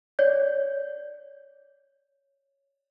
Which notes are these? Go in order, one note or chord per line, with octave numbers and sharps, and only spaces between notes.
C#5 D5 G6